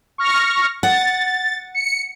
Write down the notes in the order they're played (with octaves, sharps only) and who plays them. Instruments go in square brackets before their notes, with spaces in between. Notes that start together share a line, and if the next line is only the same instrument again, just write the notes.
[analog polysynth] C#6 F6 A#6
[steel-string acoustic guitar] F#5 [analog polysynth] A6
[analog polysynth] C#7